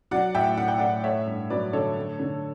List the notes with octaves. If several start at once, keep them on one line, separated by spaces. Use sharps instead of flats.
F#3 D5 F#5
A2 E5 G5
A2 F#5
G5
A2 D5 F#5
A3 C#5 E5
G2
F#3 B4 D5
D3 A4 C#5
A3
D3